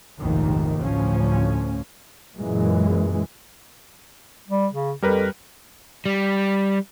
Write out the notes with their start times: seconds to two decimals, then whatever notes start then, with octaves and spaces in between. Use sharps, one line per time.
0.20 F1 A#1 D#2 G#2 C3 D#3
0.82 A1 D2 A2 D3 F3 C#4
2.37 F#2 A#2 E3 G#3
4.48 G3
4.73 C#3
5.02 F2 G3 A#4 B4
6.06 G3